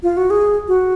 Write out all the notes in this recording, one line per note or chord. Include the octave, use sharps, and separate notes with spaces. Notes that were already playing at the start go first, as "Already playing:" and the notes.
F4
F#4
G#4
F#4